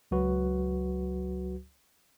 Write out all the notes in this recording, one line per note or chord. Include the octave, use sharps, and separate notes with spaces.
C#2 F#3 F#4 B4